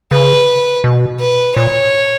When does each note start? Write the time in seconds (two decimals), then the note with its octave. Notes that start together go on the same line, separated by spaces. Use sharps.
0.11 C#3 B4
0.84 B2
1.20 B4
1.56 A#2 C#5